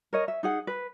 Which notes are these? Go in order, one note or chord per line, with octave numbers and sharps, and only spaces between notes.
A#4 C#5 D#5
E5
D#4 G#4 F#5
B4